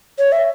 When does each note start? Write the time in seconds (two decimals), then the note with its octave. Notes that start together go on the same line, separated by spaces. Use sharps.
0.19 C#5
0.32 E5